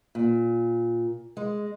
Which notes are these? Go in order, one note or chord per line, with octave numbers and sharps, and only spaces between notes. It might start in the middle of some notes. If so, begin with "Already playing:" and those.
A#2
G#3